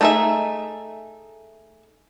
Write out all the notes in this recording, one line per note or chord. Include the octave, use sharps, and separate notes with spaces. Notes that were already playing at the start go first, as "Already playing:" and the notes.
A3 D4 D#4 G#4 E5